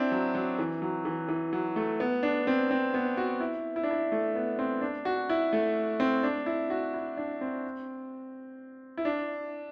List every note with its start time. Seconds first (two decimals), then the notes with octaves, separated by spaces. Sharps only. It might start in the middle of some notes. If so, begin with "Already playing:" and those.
Already playing: C4 D4 E4
0.12 F#3
0.35 F#3
0.58 E3
0.82 F#3
1.05 E3
1.28 E3
1.53 F#3
1.76 A3
2.00 B3
2.23 D4
2.47 C4
2.71 C4
2.94 B3
3.17 F#4
3.40 E4
3.76 E4
3.83 D4
3.91 E4
4.12 A3
4.35 B3
4.59 C4
4.81 D4
5.05 F#4
5.30 E4
5.53 A3
6.00 C4
6.23 D4
6.46 E4
6.70 F#4
6.94 E4
7.17 D4
7.41 C4
8.97 E4
9.05 D4